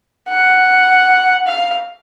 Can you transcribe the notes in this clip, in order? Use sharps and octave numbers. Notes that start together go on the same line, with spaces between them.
F#5
F5